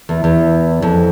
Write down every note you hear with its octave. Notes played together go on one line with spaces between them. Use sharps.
E2
E2
F2